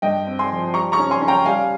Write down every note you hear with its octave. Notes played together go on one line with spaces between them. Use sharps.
G2 D#5 G5
C4
G#5 C6
F3
G3 A#5 C#6
A#5 C#6
C#4
G#5 C6
C#4
G5 A#5
G3 F5 G#5